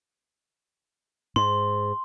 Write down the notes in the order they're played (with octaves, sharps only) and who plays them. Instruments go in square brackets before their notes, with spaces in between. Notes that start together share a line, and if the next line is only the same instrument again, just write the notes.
[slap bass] G#2 [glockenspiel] C6